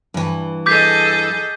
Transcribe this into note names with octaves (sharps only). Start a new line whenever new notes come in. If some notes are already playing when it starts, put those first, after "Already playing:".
G2 E3
G#4 A4 D#5 D6 G6 B6